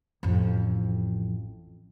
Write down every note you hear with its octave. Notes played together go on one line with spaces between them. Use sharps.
A1 F2